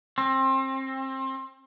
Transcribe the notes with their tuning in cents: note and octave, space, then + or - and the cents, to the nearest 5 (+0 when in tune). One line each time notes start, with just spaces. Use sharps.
C4 +30